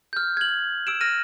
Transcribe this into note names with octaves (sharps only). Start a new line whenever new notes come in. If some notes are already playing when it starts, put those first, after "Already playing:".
F6 G6
G#6 F#7
E6 D7 E7
F6 A#6 D#7